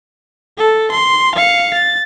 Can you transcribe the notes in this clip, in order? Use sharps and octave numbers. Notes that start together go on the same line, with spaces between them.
A4
C6
F5 C#7
A6